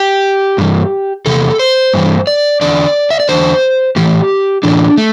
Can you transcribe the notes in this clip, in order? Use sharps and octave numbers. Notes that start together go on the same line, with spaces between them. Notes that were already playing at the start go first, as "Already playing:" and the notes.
Already playing: G4
G2 E3
E2 C3 A4
C5
G2 E3
D5
E2 D3 D5
E5
D5
E2 D3 C5
A2 E3 G4
A2 E3 D4
A3